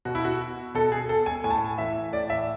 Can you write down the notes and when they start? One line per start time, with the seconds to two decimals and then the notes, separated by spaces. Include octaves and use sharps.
0.05 B2 F#4
0.15 E4
0.24 F#4
0.74 B2 A4
0.92 G#4
1.09 A4
1.26 G#5
1.44 A2 G#5
1.50 A5
1.58 G#5
1.78 E3 E5
2.12 A2 D5
2.30 E5